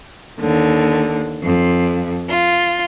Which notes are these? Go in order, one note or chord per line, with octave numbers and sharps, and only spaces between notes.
D#2 D3
F2
F4